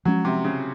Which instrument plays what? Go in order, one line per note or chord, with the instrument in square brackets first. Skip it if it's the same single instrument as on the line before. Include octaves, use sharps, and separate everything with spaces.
[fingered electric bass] F3 G#3 C#4 [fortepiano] F#3
[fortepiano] C3
C#3